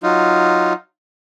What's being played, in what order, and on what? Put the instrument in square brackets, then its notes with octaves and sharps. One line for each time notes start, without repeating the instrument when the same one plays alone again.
[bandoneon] F#3 D#4 F4